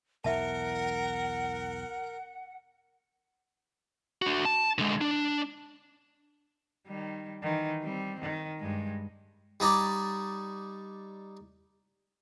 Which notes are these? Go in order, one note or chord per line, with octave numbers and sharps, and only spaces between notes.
B1 E2 E3 A#4 E5 F#5 A5
D4 F#4
A5
D3 G#3
D4
D#3 G3
D#3 E3
G3 C4
D#3
G2 G#3
G3 D#4 C#5 D5